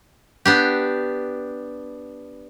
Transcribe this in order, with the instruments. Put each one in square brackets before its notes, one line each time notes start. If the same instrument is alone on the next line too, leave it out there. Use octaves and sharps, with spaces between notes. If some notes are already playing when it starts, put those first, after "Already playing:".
[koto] B3 D4 G4